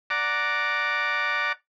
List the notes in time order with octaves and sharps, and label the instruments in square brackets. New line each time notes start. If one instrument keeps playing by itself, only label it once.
[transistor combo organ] D5 F#5 A#5 D6